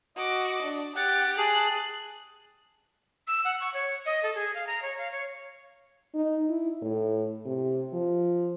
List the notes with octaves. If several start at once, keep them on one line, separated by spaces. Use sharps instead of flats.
F#4 D#5 D6
D4
G4 F#5 A6
G#4 A5 F#6
E6
F#5
C#6
C#5
D#5
A4
G#4
F5
A#5
C#5
F5
C#5
D#4
E4
A2
C3
F3